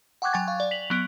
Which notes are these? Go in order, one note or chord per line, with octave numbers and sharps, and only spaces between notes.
F#5 G5 C#6 D6 F#6 G#6
F#3 G5 G#5 A6
F5 C#6
D5
B6 F7 F#7
F#3 B3 D7